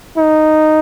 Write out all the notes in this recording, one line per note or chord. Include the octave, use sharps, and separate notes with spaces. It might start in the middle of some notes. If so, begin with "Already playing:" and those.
D#4